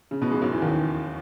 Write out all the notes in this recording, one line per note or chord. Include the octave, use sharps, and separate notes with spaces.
C#3
B2 B3
G#2 G#3
F#2 F#3
E2 E3
D#2 D#3